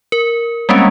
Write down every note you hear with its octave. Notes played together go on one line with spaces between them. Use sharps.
A#4
G3 G#3 A#3 C4 C#4